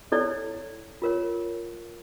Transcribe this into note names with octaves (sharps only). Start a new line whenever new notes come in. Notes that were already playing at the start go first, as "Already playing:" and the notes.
E4 A4 C#5 D5
F4 A#4 C#5